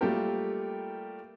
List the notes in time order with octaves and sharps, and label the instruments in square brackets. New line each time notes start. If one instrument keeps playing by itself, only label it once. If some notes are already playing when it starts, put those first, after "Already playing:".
[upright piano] G3 A3 A#3 F4 G4 A#4